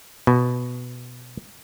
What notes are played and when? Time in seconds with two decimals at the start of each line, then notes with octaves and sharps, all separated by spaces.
0.27 B2